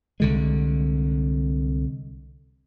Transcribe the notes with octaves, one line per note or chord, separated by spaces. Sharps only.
C2 D3 G#3